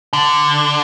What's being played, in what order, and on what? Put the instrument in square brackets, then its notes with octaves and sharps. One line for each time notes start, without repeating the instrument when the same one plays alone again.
[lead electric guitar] D3